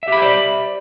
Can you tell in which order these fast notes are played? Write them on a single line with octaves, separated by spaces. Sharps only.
E5 G4 B5 C5 D5